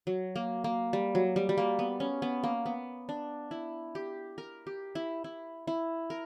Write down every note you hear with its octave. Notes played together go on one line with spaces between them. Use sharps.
F#3
A#3
A#3
G3
F#3
G3
G3
A#3
B3
C#4
B3
A#3
B3
D4
E4
G4
A#4
G4
E4
E4
E4
A#4